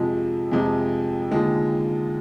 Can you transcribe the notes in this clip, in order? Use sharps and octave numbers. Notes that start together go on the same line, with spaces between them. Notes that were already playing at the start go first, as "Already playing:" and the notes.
Already playing: F2 C3 F3 G#3
F2 C3 F3 G#3
D#2 D3 F3 G#3